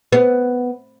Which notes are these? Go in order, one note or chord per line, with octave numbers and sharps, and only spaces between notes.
B3